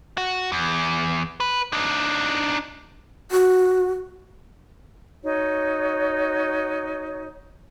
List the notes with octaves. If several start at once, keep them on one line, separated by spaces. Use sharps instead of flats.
F#4
E2
B4
D4 D#4
F#4
D#4 F#4 C#5